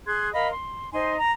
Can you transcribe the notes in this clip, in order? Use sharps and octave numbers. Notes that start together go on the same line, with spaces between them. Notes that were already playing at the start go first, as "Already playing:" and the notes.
G#4 C6 F#6 G#6
A#4 D#5 F5 B5
C6
D#4 C5 G#5 C6
A#5